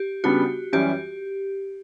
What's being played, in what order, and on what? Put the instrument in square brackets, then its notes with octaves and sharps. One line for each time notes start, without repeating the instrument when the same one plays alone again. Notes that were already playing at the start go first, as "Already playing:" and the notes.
Already playing: [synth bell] G4
[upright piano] C#3 G3 B3 D4 [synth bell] F#4
[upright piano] F#2 E3 G3 C#4 [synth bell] G4